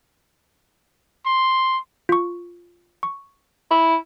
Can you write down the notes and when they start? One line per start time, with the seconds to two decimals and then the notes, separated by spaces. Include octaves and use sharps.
1.26 C6
2.09 F4 C#6
3.03 C#6
3.71 E4